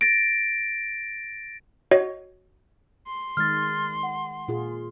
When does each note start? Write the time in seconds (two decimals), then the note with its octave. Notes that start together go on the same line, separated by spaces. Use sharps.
0.01 A6 A#6 D7
1.91 F#4 C#5 D#5
3.07 C6
3.37 D#3 G#3 F6 A6
4.03 F#5
4.48 A#2 F4 G#4